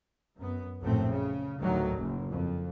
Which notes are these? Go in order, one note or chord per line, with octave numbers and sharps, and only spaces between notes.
F#2 B3
A#1 F#2 A2 A3 C4
C#3
D2 A2 D#3 F#3
F#1
F2